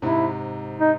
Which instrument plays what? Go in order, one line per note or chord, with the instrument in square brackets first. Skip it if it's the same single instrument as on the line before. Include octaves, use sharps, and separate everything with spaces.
[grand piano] G#2 C3 [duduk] E4
[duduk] D#4